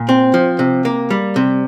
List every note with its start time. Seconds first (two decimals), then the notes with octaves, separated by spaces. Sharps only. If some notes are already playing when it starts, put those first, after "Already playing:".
Already playing: A#2
0.09 C4
0.34 F3
0.59 C3
0.85 A#3
1.10 G3
1.36 C3